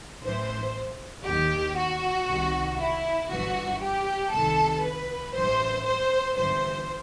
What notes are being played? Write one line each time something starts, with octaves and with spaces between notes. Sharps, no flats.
A1 A2 E3 C5
D#2 D#3 G4
F#4
C2 C3 D#3
E4
G1 G2 E3 F#4
G4
C2 C3 D#3 A4
B4
A1 G2 E3 C5
C5
G1 G2 E3 C5